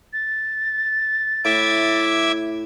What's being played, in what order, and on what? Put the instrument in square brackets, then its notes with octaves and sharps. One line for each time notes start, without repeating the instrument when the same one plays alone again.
[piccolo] A6
[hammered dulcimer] A2 [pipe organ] E5 D6 G#6